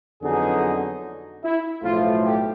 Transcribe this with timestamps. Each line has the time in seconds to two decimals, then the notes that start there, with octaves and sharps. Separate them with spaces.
0.22 F2 D3 F#3 B3 D#4 G#4
1.44 E4
1.83 B1 A2 F3 A3 F4
2.24 G4